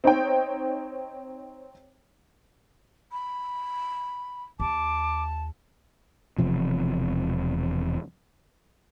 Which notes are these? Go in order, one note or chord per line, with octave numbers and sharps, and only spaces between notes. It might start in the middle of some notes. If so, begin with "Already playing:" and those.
C4 D#4 C#5 G5
B5
D#2 A5 D6
E1 E2 C3 F3